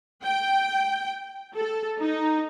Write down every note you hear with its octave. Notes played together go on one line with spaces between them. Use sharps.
G5
A4
D#4